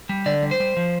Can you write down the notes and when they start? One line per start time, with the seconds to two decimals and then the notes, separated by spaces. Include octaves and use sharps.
0.09 G3
0.26 D3 D5
0.42 G3
0.51 C5
0.60 G3
0.77 F3